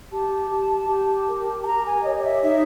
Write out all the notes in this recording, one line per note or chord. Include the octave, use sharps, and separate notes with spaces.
G4 A5
G4
G4
A#4
A5
G4 A#5
G#5
C#5 D#5
E5
D#4 E5